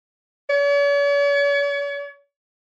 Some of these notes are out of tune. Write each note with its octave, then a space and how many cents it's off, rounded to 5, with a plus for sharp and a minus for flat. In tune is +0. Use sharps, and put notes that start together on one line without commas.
C#5 +45